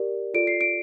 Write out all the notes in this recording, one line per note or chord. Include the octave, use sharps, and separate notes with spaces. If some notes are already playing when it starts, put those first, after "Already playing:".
Already playing: G4 A#4 D5
F4 A4 D5 D7
C7
D7